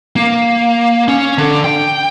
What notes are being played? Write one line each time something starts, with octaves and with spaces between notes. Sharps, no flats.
A#3
C#4
D3
G5